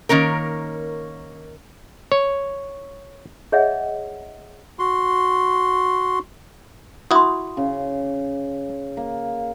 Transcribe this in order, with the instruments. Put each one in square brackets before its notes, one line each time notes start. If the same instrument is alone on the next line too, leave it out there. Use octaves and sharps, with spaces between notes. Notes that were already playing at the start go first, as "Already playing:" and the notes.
[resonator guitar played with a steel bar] D#3 A#3 C#4 A#4
[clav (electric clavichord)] C#5
[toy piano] G#4 C#5 D#5 E5 F#5
[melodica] F#4 C6
[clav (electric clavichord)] E4 F#4 [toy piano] C6 D#6
[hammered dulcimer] C#3
A#3